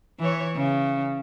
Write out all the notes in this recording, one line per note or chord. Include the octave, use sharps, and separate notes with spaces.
E3 C#5
C#3